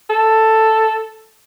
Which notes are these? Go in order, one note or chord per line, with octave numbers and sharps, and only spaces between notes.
A4